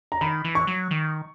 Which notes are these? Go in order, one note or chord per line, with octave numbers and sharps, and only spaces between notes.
A#5
D#3 B5
E3
C#6
F#3
D#3